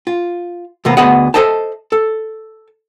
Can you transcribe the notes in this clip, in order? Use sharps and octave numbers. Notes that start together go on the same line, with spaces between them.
F4
E2 A2 C3 A#3 B3
D2 B3 G#4 D#5 F#5
A4 B4 C5 D#5 E5 A5
A4